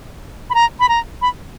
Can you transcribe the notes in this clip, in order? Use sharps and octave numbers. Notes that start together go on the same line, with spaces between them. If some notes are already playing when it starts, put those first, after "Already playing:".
B5
A#5
B5
A#5
B5